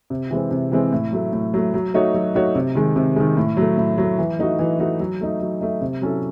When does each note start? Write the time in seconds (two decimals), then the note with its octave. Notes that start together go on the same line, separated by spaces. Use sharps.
0.10 C3
0.31 E3 G#3 C4
0.51 C3
0.72 E3 G#3 C4
0.92 A2
1.12 F#3 A3
1.33 A2
1.54 F#3 A3
1.74 F#3
1.94 A3 D#4 F#4 C#5
2.14 F#3
2.35 A3 D#4 F#4 C#5
2.55 C3
2.75 D#3 G#3
2.96 C3
3.16 D#3 G#3
3.37 A2
3.57 F#3 A3
3.78 A2
3.98 F#3 A3
4.18 E3
4.39 A3 D#4 F#4
4.59 E3
4.79 A3 D#4 F#4
5.00 F#3
5.21 A3 D#4
5.41 F#3
5.61 A3 D#4
5.81 C3
6.02 F#3 C#4 E4 A4